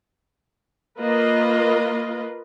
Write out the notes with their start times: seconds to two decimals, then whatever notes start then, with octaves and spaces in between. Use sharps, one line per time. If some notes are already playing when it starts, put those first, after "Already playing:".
1.00 A#3 F4 B4 D#5